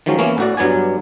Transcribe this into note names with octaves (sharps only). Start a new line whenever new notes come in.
D#3 F3 F#3 G#3 C#4
E3 A#3 B3 C#4
A2 F#4 D5
G2 F#3 B3 D5 G#5